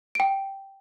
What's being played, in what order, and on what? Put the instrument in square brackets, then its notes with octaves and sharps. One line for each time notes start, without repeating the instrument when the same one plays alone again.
[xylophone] G5 D7